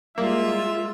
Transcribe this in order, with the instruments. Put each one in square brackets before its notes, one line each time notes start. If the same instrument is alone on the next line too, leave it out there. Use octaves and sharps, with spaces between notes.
[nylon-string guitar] G3 E4 [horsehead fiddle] G#3 F4 [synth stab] A#3 [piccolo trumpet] E5